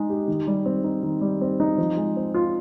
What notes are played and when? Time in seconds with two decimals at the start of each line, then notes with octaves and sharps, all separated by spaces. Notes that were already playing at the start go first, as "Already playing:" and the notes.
Already playing: G#3 D#4
0.10 G4
0.28 D#3
0.47 G3
0.66 C4
0.84 D#4
1.03 D#3
1.21 G3
1.41 C4
1.60 D#4
1.78 F3
1.97 G#3
2.16 C4
2.34 F4